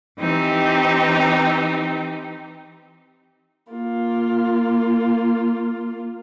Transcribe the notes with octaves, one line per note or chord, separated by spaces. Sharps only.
E3 C4 D#4 G4
A#3 F4